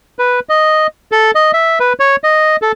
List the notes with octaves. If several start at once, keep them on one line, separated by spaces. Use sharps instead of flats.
B4
D#5
A4
D#5
E5
B4
C#5
D#5
A4